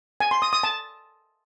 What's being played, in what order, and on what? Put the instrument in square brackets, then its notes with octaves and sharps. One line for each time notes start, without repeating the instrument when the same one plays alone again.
[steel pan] G#5
C6
D#6
D#6
A5